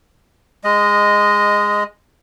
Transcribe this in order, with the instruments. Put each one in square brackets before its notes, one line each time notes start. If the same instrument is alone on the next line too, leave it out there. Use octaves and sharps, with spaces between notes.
[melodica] G#3 D#5